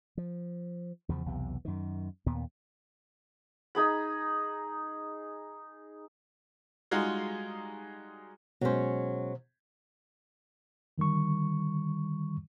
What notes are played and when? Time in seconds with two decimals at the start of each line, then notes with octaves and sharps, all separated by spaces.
0.17 F3
1.09 E2 C#3 F3
1.26 B1 E2 C3
1.65 F#2 D#3
2.26 D#2 A#2 B3
3.75 D#4 G#4 B5
6.91 G3 G#3 D#4 F4 F#4 G#4
8.61 B2 F#3 G#3 C#4 C5
10.98 D3 D#3 G3 C#6